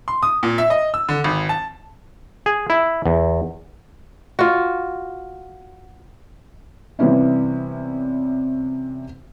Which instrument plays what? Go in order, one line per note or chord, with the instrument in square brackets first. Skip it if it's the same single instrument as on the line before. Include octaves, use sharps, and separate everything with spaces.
[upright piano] C6
D#6
A#2
E5
D#5
E6
D3
G#1
A5
[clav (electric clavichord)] G#4
E4
E2
[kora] F4 F#4
[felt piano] C3 E3 G3 B3 C#4 E4